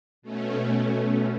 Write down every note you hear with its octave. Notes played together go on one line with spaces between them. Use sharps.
B2 A3 C#4